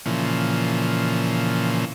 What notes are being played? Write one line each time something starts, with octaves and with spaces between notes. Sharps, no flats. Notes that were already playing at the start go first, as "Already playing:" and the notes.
A#2 C#3 E3 F3